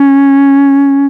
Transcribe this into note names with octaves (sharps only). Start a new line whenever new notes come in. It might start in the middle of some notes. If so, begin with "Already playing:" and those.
Already playing: C#4